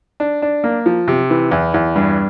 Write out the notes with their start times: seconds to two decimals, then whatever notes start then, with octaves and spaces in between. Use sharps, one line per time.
0.20 D4
0.42 D4
0.64 A#3
0.86 F3
1.08 C3
1.30 E3
1.51 E2
1.74 E2
1.96 G2